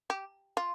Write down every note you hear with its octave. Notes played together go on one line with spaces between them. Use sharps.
G4
F4